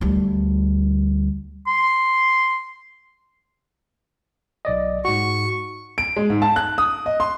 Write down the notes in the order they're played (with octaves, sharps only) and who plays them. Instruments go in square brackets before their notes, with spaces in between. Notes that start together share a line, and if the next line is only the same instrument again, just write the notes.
[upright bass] D2 G3
[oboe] C6
[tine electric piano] B1 D5 D#5
[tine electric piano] G#2 F#4 [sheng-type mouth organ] C#6
[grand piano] D7
G#3
G#2
A5
F#6
D#6
D#5
C6